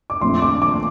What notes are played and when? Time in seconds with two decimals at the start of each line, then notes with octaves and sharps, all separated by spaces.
0.10 D6
0.21 A#1 A#2 A3 C4 C6
0.42 D6
0.62 D6